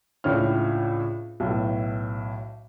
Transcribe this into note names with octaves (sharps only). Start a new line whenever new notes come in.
C#2 A2 C#4 D4 F6
B1 A2